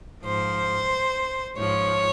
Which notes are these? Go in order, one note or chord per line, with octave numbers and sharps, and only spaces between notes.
G#2 F3 C5
G#2 F3 C#5